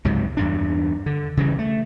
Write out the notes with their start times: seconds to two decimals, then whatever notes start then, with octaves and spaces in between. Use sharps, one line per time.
0.05 C#2 G#2 C3 F#3
0.37 E2 G2 D4
1.06 D3
1.37 C#3 E3 G3
1.59 A3